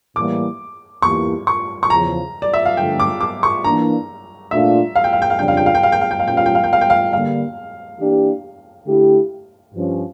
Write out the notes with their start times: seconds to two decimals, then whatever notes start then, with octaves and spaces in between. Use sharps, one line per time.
0.16 A2 E3 G3 A#3 D6
1.02 E2 E3 A#3 E4 G4 C#6
1.47 C#6
1.83 C#6
1.90 E2 C#3 F3 A#5
2.42 D5
2.54 E5
2.65 F5
2.77 G2 D3 F3 A3 G5
3.00 D6
3.21 D6
3.43 C#6
3.64 E3 A#3 D4 A#5
4.51 A#2 A3 D4 F4 E5
4.96 F5
5.04 G5
5.13 F5
5.22 G5
5.30 F5
5.38 F2 C#3 G3 D4 F4 G5
5.48 F5
5.57 G5
5.66 F5
5.75 G5
5.83 F5
5.92 G5
6.01 F5
6.11 G5
6.20 F5
6.26 A#2 G3 C#4 F4 G5
6.37 F5
6.46 G5
6.55 F5
6.64 G5
6.73 F5
6.81 G5
6.90 F5
7.13 D3 G3 A#3 F5
7.99 E3 A#3 D4 G4
8.87 D3 A3 E4 G4
9.74 G2 F3 C#4